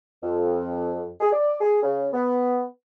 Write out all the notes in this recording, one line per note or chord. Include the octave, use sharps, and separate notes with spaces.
F2
G#4
D5
G#4
C#3
B3